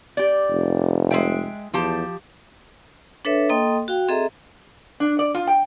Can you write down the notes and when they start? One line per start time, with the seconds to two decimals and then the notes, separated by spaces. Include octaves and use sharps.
0.17 G4 D5
0.50 F1
1.11 G#3 E5 G5
1.73 E2 F3 G4 A5
3.25 D4 A4 B4 C#5 E5
3.49 A#3 A4 D#5 G5 C6 D#6
3.88 F#4 F5 G5
4.08 C4 G#4 A4 D#5 E5 A#5
5.00 D4
5.19 D5
5.34 F4
5.47 G5